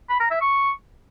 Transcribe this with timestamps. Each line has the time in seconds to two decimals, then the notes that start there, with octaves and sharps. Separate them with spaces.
0.10 B5
0.20 A#5
0.31 E5
0.41 C#6